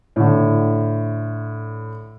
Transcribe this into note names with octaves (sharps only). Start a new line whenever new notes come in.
A2 D3